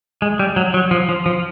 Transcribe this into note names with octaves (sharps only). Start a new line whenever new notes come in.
G#3
G3
F#3
F#3
F3
F3
F3